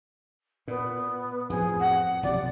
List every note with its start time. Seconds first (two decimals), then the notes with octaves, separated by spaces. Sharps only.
0.68 A#2 B3
1.50 F2 A2 F3 G#4
1.80 F#5
2.23 B1 F2 C3 D5